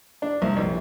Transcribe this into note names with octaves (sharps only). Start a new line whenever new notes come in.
D4
C2
A#1